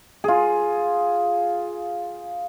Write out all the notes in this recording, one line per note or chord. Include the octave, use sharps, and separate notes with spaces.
F4 G#4